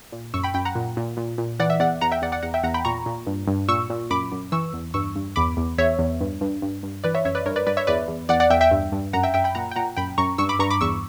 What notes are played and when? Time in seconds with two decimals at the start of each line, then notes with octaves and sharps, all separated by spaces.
0.12 A#2
0.34 F#2 C#6 E6
0.44 G5 B5
0.54 F#2 G5 B5
0.65 F#5 A#5
0.75 A#2
0.97 A#2
1.17 A#2
1.38 A#2
1.60 E3 D5 F#5
1.70 E5
1.80 E2 D5 F#5
2.01 E2 F#5 A#5
2.12 E5 G5
2.22 E2 D5 F#5
2.32 D5 F#5
2.42 E2 F#5 A#5
2.54 E5 G5
2.64 E2 F#5 A#5
2.74 G5 B5
2.85 A#2 A#5 C#6
3.06 A#2
3.27 G2
3.48 G2
3.68 A#2 C#6 E6
3.90 A#2
4.10 F#2 B5 D6
4.32 F#2
4.52 E3 C#6 E6
4.73 E2
4.94 G2 C#6 E6
5.16 G2
5.36 E2 B5 D6
5.57 E2
5.78 E2 C#5 E5
5.99 E2
6.21 G2
6.41 G2
6.62 G2
6.83 G2
7.04 E3 B4 D5
7.15 C#5 E5
7.25 F#2 C#5 E5
7.35 B4 D5
7.46 G2 A#4 C#5
7.56 B4 D5
7.66 G2 B4 D5
7.77 C#5 E5
7.87 E2 B4 D5
8.08 E2
8.29 E2 D5 F#5
8.40 D5 F#5
8.50 E2 E5 G5
8.61 E5 G5
8.71 G2
8.92 G2
9.13 F#2 F#5 A#5
9.23 E5 G5
9.34 F#2 E5 G5
9.44 G5 B5
9.55 A#2 F#5 A#5
9.71 G5
9.76 A#2 F#5 A#5
9.97 F#2 G5 B5
10.18 F#2 A#5 C#6
10.38 G2 C#6 E6
10.49 B5 D6
10.59 G2 A#5 C#6
10.70 B5 D6
10.81 E2 C#6 E6